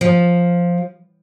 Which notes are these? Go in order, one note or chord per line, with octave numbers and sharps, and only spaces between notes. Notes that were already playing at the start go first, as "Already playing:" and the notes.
F3